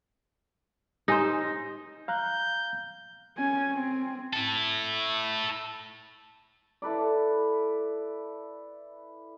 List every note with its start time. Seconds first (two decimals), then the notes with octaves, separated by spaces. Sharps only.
1.08 D#4 G4 C5 G#5
2.08 F5 A#5 F#6 G6
3.37 C#4 G#5
3.72 C4
4.33 E4 A4
6.82 E4 A4 B4 D5